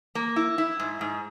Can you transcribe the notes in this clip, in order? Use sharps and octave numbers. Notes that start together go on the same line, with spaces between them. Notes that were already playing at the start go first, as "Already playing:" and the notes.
A#3
E4
E4
G#2
G#2